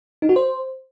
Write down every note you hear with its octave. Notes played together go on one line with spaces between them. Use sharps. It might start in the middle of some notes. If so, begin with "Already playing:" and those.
D#4
F#4
C5